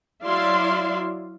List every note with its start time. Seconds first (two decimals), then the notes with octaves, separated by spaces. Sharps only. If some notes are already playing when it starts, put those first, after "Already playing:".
0.23 F#3 E4 D5 E5 F5 C6